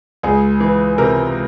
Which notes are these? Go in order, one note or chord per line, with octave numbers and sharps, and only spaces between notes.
C#2 G#4
E3
C3 A#4